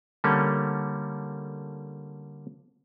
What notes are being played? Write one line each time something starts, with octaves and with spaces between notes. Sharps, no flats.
D3 G3 A3 A#3 C#4